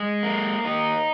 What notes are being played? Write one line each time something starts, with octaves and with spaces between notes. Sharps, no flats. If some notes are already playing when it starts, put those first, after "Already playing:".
Already playing: G#3
A#3
D#4